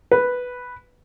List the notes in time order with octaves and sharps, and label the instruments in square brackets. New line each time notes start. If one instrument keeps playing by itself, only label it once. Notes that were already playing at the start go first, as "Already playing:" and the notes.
[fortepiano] B4